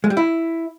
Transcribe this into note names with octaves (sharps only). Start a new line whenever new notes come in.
G#3
G3
E4